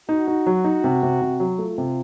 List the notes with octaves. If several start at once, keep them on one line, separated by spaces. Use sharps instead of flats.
D#4 F#4
D#4
F#3
D#4
C3
C3
C3
F#3
A3 F4
C3